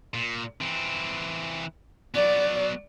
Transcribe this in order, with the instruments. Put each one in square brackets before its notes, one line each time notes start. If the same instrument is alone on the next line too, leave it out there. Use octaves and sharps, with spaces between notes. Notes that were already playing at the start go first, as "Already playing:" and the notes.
[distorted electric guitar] A#2
E3 C4
[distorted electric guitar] F#3 B3 [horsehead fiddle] D5